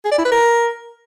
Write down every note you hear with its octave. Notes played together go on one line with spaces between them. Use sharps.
G#4
D5
E4
B4
A#4